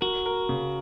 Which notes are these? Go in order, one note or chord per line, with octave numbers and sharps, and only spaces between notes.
F#4 A#4
A#4
C#3